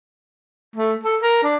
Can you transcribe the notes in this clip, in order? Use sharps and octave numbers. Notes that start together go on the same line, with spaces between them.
A3
A4
A#4
D4